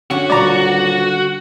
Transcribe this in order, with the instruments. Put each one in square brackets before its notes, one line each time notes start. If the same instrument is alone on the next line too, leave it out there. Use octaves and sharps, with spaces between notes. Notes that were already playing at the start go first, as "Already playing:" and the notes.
[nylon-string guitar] D3 C#4 [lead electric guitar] F#4
[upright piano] D#1 F#3 [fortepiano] D5 A#5